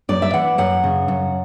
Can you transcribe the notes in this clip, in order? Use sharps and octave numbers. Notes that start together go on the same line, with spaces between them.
F#2 D5
E5
E3 F#5
F#2 F#5
C#3
F#2